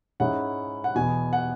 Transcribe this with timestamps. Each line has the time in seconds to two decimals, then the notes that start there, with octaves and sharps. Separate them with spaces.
0.20 G#2 G#3 C#4 E4 F#5
0.84 F#5
0.95 E2 B2 B3 G#5
1.33 F#5